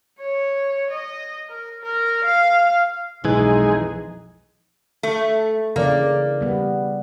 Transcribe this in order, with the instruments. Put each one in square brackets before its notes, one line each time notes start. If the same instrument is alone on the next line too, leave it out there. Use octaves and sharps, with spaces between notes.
[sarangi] C#5
D#5
A#4
A#4
F5
[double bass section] B1 F2 [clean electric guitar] E3 [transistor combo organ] G#3 G#4 [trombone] D#4
[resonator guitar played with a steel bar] A3
[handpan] C#3 E3 D5 [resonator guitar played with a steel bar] A#3
[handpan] G3 B3